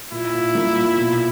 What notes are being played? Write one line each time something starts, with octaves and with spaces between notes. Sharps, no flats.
A#2 E4
A#2
A#3
A#2
B2